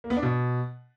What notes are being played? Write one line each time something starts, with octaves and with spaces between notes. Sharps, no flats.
A#3
B3
D4
B2